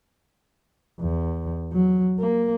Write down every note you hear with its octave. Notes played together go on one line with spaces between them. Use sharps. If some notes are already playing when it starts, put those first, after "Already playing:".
E2
F#3
A#3